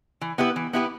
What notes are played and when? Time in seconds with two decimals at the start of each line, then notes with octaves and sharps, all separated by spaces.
0.21 E3
0.38 B3 E4 G4 B4
0.56 E3
0.73 B3 E4 G4 B4